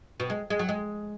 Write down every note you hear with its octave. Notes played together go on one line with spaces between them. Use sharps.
B2
G#3
G#3
F#3
G#3